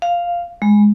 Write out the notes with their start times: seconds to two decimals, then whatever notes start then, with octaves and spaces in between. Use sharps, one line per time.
0.02 F5
0.62 G#3